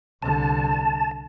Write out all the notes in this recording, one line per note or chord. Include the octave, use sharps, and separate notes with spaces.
C2 D3 A5